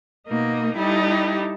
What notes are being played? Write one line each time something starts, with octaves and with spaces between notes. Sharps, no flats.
B2 A#3 D#4
G3 D#4 E4 G4 A4